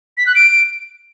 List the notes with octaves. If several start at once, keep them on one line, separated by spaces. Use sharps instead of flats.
B6
F#6
D7